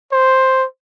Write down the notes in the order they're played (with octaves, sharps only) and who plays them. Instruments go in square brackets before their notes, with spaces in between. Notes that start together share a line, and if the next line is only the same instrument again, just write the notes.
[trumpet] C5